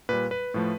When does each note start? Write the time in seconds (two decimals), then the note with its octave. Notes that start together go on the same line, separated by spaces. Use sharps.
0.09 A#2 G3 B4
0.31 B4
0.54 A2 F3 A3